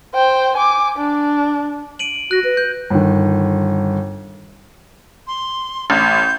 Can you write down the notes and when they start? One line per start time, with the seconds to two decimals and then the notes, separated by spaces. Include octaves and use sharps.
0.14 C5 G5
0.56 G#5 D6
0.97 D4
1.99 D7 D#7 F#7
2.31 F#4 F#6 A#6
2.44 B4
2.57 G6
2.90 G1 D#3
5.27 C6
5.90 A1 G6